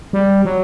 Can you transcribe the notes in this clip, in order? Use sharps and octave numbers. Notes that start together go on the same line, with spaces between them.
G3
F#3